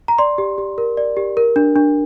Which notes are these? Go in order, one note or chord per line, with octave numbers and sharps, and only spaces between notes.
A#5
D5 C6
G4
G4
A#4
D5
G4
A#4
D4
D4